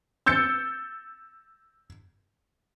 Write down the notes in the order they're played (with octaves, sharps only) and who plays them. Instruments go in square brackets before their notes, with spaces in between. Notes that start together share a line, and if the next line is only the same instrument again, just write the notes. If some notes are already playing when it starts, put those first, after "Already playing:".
[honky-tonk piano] E6 G6 A6 C#7